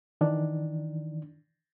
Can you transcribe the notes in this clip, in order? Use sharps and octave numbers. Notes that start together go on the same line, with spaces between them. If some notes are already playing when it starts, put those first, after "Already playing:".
D#3 E3 D4